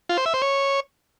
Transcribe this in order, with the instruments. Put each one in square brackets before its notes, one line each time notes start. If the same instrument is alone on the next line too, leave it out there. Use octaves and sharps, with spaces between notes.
[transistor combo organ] F4
C5
E5
C5
C#5